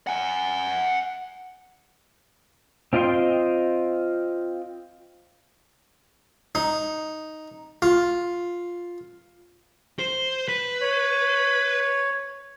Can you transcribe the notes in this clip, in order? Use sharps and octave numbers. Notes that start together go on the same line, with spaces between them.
F#5 G#5
C4 F4 D#5 G5 C6
D#4
F4
C5
B4
C#5